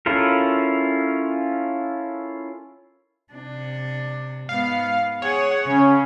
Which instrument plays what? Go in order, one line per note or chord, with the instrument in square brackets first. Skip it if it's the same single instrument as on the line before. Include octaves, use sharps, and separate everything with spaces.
[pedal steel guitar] C#4 E4 F4 A4 A#4
[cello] C3 D4
[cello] G#2 B3 [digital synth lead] F5
[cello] G#4 F#5 [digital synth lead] C#5
[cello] C#3 [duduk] C#4